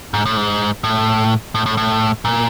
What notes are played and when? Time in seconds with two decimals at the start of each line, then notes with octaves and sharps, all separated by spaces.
0.14 G#2
0.26 A2
0.37 G#2
0.84 A2
1.55 A2
1.66 A2
1.77 A2
2.25 A#2